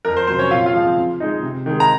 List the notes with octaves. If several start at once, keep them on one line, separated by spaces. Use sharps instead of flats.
F2 A#4
C5
C3 F#3 C5
C#4 C#5
A#2 F4 F5
F4 F5
F3 G#3 C4
C#3
G#3 D#4
C3
D#3 G#3
A#5